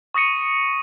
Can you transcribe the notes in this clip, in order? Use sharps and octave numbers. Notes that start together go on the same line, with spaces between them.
C#6 D#6 A#6 C#7 D#7